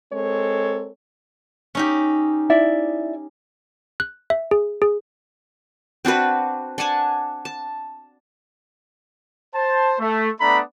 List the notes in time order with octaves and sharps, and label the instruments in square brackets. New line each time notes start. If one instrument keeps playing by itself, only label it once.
[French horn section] G#3 C4 A4 A#4 C#5
[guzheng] C#4 D#4 G4
[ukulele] E4 D5 E5
[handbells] F#6
E5
G#4
G#4
[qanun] C4 D4 F#4 B4
D4 F#5 G#5 A5
A5
[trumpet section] C5 A5
A3
A3 B3 D4 D5 A#5 B5